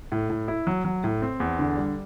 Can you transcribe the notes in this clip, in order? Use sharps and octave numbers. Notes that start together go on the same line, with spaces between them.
A2
A2
E4
F#3
F#3
A2
C4
E2
D3
G3